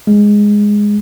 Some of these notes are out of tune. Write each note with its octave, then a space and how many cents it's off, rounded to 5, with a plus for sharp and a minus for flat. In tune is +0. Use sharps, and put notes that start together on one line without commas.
G#3 -5